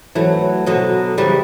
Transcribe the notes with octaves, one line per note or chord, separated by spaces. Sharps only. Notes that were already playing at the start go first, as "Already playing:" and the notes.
E3 F#3 A3
B2 D3 F#3
C#3 E3 G3